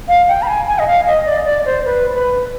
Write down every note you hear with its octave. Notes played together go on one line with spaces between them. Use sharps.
F5
G5
B5
G#5
G#5
D#5
F5
D#5
D5
D5
C5
B4
B4